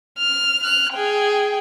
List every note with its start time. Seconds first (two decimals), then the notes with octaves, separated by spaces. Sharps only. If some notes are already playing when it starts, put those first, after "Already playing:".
0.19 F6
0.64 F6 F#6
0.94 G#4 G5